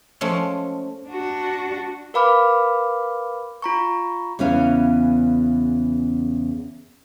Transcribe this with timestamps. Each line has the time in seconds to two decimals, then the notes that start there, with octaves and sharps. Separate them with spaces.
0.21 F3 G#3 A3 C#4
1.08 D4 F#4
2.14 A#4 B4 F5 B5 D6 F6
3.62 F4 A#5 C#6
4.39 E2 C#3 B3 C#4 F5